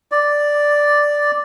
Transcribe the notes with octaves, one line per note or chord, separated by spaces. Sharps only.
D5